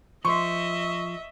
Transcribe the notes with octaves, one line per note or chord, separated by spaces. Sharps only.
F3 D#5 E5 C6 C#6